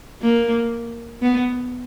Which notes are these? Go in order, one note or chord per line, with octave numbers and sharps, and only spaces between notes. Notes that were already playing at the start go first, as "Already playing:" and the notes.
A#3
B3